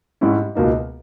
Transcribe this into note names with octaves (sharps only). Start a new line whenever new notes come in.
G#2 G3 C#4 E4
C#2 B2 A#3 D#4